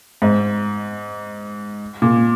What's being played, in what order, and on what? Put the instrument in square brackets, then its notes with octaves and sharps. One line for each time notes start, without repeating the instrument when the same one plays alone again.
[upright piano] G#2
A#2